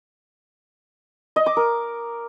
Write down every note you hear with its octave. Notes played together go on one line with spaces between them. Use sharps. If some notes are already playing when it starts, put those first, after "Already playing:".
D#5
D6
A#4